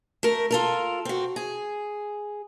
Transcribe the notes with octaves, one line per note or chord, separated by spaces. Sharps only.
A3 A#4
F4 A4 A#4
C4 F#4
G#4